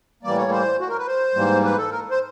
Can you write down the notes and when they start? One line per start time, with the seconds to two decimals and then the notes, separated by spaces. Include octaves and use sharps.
0.23 A2 E3 G3 A#3 D5
0.38 C#5
0.51 C5
0.80 F#4
0.89 A#4
0.99 B4
1.08 C5
1.35 G#2 E3 G3 A#3
1.64 B4
1.78 A4
1.91 A#4
2.11 C5